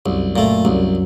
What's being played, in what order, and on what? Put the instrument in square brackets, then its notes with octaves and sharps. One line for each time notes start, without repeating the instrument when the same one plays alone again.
[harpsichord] C2 [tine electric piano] F#2 F#3
[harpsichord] A#2 A3
[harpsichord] C2 [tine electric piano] F#2 F#3